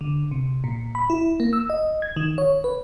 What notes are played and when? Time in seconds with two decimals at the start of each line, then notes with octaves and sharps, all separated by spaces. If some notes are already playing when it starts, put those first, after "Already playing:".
0.01 D3
0.31 C3
0.64 A#2
0.95 B5
1.10 E4
1.40 A#3
1.53 E6
1.70 D#5
2.02 G#6
2.16 D#3
2.38 C#5
2.64 B4